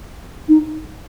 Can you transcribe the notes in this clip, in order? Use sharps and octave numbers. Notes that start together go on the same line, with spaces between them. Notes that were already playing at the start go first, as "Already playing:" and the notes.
D#4